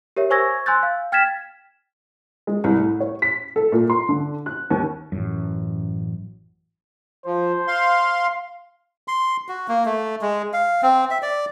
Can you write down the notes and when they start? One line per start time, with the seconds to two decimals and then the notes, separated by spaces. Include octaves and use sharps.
0.16 G4 A#4 C#5 E5
0.30 C5 G#5 C#6 E6 G#6 A#6
0.66 G#5 C6 E6 F#6 G6 A6
0.83 F5
1.12 G5 F6 G#6 A6 B6 E7
2.47 G#3
2.64 C2
2.78 A2
3.00 C#5
3.22 B6
3.56 A4
3.72 A#2
3.90 C6
4.09 D3
4.46 F#6
4.71 D#2
5.12 A1 F#2
7.26 F3 C5
7.68 F5 C6
9.08 C6
9.48 F#4
9.68 A#3
9.85 A3
10.21 G#3
10.53 F5
10.82 C4
11.11 E5
11.22 D5